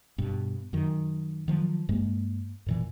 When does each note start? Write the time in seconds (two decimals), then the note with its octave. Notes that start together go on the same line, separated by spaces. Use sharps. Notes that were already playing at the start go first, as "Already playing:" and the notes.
0.18 G2 B2
0.73 F#2 D#3
1.48 D#3 F3 F#3
1.89 G2 G#3 A#3
2.66 F#2 A#2 E3